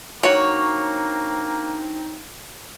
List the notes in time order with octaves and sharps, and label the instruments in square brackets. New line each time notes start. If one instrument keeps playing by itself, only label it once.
[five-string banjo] F#3 F#4 [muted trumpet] A#3 [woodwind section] C4 D4 D#4 [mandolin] C#5